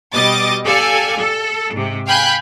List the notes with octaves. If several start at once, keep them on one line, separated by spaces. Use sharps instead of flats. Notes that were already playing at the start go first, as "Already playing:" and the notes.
B2 G3 D#5 D6 A6
G4 A4 D5 F5 G#5
A4
G#2 C3
F5 G5 G#5 B5 F#6 G6